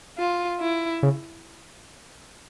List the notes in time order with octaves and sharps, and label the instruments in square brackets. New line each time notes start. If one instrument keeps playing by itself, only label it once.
[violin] F4
E4
[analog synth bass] C#3